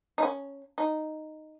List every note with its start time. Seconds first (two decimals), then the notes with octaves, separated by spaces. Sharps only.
0.18 D#4
0.23 C#4
0.78 D#4